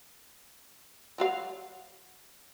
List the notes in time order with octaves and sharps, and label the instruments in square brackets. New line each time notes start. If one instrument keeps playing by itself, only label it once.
[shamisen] F#3 F#4 F5